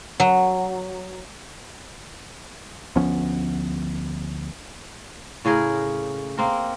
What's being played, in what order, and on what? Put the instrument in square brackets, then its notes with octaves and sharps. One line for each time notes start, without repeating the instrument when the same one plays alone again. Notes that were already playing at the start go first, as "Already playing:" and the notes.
[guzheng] F#3
[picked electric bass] D2 F3 B3 C#4
[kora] A2 C#3 G#4 A#4
A#3 C4 A#4